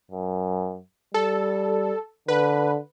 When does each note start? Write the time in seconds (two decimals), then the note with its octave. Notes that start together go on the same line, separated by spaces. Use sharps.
0.11 F#2
1.14 G3 A4
2.28 D3 B4